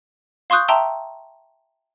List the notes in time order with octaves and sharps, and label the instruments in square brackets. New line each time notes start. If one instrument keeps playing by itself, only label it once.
[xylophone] F5 C6 C#6 D#6 F#6 G6
E5 G5 A5 A#5 C6 E6